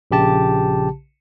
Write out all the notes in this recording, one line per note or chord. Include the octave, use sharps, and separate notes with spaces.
A#1 C#3 G4 A5